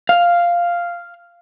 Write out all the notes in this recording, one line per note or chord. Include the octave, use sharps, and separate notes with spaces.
F5